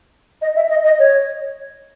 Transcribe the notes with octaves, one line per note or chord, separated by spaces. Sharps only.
D#5
E5
D#5
D#5
C#5